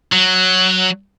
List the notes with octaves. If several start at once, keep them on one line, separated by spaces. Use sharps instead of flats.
F#3